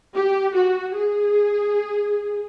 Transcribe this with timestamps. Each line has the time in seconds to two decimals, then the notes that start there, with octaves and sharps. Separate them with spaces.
0.14 G4
0.55 F#4
0.96 G#4